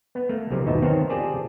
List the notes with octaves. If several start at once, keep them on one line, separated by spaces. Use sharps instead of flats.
B3
A3 A#3
B1 C3 F3
G1 D#2 B2 D#4 E5 A5
D#3 B3 C4 A#4 C5 C#5
C4 F4 G4 G#4 D5 A5